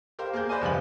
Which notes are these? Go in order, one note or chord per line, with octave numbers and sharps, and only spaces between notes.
G4 A#4 C5 F5
A#3 G#4 A#4 G6
B4 C5 D5 D#5 G#5
F#1 F3 F4 G4 G#5 F#7